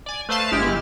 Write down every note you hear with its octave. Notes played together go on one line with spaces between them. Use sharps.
D5 G#5
A3 B4 C5 F5 A5
G1 G#3 E4 G4 F6